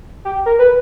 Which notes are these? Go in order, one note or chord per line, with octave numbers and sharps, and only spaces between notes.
G4
A#4
B4